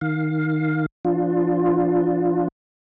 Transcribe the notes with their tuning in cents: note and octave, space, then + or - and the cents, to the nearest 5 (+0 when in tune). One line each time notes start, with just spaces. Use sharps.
D#3 +0 F5 +15
F3 -35 D4 +0 F4 +15